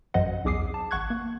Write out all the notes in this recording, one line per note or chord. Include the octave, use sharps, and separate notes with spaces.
A1 F#2 F#3 C5 D#5 F#5
B1 E2 G#4 D6 D#6 C7
A5
G#1 F#5 C#6 F#6 G#6
A#3